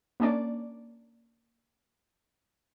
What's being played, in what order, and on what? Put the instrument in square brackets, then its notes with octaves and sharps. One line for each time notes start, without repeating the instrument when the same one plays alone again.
[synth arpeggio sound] A#3 C#4 D4 D5